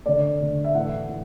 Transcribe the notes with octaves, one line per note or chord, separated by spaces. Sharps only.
D3 A3 D5
D3 A3
E5
A2 E3 A3 F#5
A2